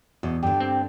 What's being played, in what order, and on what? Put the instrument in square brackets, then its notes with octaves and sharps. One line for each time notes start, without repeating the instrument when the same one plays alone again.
[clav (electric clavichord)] E2 [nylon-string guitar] B2
[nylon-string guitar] G2 D3 [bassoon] G4
[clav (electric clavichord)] C4